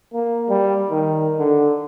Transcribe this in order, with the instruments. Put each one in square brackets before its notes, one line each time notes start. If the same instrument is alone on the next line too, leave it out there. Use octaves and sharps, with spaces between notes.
[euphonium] A#3
G3
D#3
D3